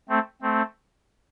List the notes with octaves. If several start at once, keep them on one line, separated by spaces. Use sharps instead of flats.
A3 C4
A3 C4